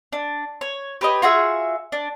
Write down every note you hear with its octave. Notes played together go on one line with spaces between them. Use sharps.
D4
C#5
G4 B4 C#5 D#5
F4 F#4 G#4 E5
D4